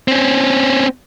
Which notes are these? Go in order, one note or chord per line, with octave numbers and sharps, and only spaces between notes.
C4 C#4